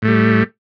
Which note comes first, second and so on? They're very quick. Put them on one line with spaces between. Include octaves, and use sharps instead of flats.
A2 A3 G3